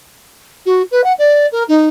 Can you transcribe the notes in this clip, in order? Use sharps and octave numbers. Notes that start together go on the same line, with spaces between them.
F#4
B4
F#5
D5
A#4
D#4